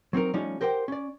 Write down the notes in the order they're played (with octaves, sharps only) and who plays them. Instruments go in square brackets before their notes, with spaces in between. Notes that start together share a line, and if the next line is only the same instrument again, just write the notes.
[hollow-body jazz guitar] F#3 C4 D#4 A#4
F3 G3 A3 C#4 D#4 F4
G4 A#4 C5 F#5 G5
C#4 D5